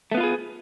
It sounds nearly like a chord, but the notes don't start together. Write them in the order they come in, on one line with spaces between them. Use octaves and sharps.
A3 B3 F4 B4 G#4